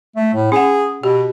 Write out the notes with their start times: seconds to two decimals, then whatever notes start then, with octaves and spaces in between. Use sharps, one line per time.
0.16 A3
0.34 A2
0.52 C#4 G#4 F#5
1.03 B2 G4